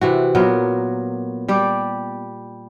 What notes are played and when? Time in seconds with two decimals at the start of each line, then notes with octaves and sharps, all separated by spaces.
0.01 C3 E3 F#4
0.35 A#2 F#3 B3 A#4
1.49 G3 G4 D5